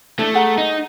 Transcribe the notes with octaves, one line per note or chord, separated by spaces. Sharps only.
A3 D4 E4
G#4 F#5 A#5
D#4